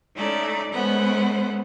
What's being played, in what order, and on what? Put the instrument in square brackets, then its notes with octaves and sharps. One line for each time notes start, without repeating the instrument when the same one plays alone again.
[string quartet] A3 C#4 D#4 E4 D5
G#3 A3 B3 C#4 C5 F#5